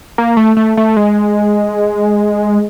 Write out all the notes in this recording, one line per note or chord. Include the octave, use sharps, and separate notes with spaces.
A#3
A3
A3
A3
G#3